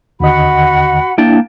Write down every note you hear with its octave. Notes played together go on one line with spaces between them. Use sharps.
D#2 D3 F#4 D#5 F#5 B5
A#3 D4 E4 G5 A5